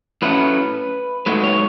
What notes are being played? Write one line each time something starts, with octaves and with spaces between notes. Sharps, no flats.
A2 F#3 A3 C#4 B4
G#2 D#3 F#3 A3 B4
C#5